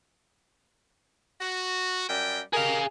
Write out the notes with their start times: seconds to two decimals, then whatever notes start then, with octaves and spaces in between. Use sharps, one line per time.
1.41 F#4
2.08 F#2 G3 G5
2.53 G4 G#4 A#4 D#5 F5